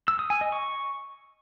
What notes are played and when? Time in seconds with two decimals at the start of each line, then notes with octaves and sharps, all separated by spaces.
0.08 E6
0.19 D#6
0.30 G#5
0.41 D#5
0.52 C#6